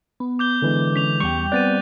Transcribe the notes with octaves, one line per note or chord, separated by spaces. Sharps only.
B3
D6 G6 G7
D3 E3 G#3
C#4 B6 F7
E2 G3 G5 C#6
B3 C4 D5 F#6 A6 D#7